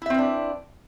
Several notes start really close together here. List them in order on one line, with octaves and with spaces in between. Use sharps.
E4 E5 C4 B4 D4